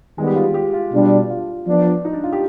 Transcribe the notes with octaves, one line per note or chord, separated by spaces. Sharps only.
D#3 G3 G#3 B3
G4
F4
G4
F4
B2 G3 D4
F4
F3 B3 D4
D#4
D4
F4
G4